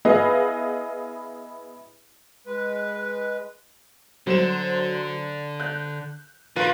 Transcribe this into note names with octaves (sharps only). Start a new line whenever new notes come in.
B3 E4 G#4 B4 D#5 F5
G#3 B4
D3 F#3 C5 E7
F#6 G6
D3 A#3 F4 B4 D7 D#7